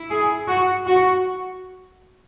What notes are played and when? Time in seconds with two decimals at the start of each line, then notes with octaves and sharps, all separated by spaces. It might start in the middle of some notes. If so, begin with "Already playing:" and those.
Already playing: E4
0.09 G#4
0.47 F#4
0.86 F#4